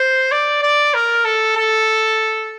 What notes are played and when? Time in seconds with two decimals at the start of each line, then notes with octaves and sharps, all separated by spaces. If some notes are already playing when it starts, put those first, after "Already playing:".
Already playing: C5
0.32 D5
0.63 D5
0.94 A#4
1.25 A4
1.56 A4